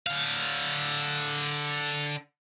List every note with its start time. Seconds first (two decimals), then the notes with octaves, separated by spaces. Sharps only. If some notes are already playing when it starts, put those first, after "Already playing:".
0.07 D3 F5